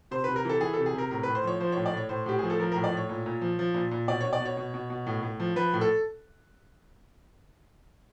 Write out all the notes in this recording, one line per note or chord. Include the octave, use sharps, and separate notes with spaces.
C3 C5
B4
C3
A#4
E3 A4
E3 G#4
A4
C3
G#4
C3 A#4
A2 A#4
B4
A2
C5
F3 C#5
F3 C5
C#5
A2
D5
A2 C#5
A2 C5
A2 G4
F3 G#4
A4
F3 A#4
A#4
A2
D5
A2 C#5
A#2
A#2
F3
F3
A#2
A#2
B2 D5
C#5
B2
D5
B2
C#5
B2
B2
B2
A2
A2
F3
F3 B4
A2
A4